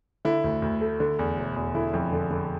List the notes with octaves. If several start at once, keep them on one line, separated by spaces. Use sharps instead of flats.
D3 E4
D2
D2
A3
D3
E2
E1
E2
D3 E4
F2
D3
D3